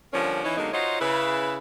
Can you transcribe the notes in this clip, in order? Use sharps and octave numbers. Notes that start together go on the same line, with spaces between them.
D3 F3 G3 A#3 C#4
E3 C#4 D#4
D3 F#3 G#3 A#3 B3 D#4
D#4 F4 F#4 C5 C#5 D#5
C#3 E4 B4